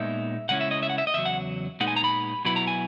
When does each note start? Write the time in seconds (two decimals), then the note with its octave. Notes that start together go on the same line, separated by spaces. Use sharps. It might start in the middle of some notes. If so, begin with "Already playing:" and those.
Already playing: A#2 G#3 B3 D#4 E5
0.49 C#3 G#3 C#4 E4 F#5
0.61 E5
0.71 D#5
0.83 E5
0.90 F#5
0.98 E5
1.07 D#5
1.14 E2 C#3 F#3 E5
1.26 F#5
1.80 A#2 G#3 B3 D#4 F#5
1.88 G#5
1.96 A#5
2.04 B5
2.45 B2 F#3 B3 E4 B5
2.56 A#5
2.67 G#5